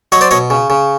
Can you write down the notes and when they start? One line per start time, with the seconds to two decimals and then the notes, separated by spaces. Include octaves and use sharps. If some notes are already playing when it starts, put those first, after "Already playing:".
0.12 F#3 C#5 D#5
0.21 C5 D5
0.31 B2 C#5 D#5
0.50 C#3
0.70 C#3